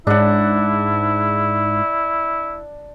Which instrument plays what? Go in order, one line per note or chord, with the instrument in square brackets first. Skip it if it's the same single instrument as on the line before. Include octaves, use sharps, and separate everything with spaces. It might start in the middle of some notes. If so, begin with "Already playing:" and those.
[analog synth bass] G#2 [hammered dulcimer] D4 F#5 [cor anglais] E4